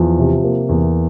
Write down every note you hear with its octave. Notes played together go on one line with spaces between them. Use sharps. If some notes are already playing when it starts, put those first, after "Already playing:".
Already playing: E2 F3
C3
A#3
E2